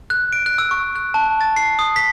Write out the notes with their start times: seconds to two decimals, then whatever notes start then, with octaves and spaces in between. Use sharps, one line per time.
0.10 F#6
0.32 D7
0.46 F#6
0.58 E6
0.71 C#6
0.96 F#6
1.14 A5
1.41 A6
1.56 C7
1.79 D#6
1.96 B6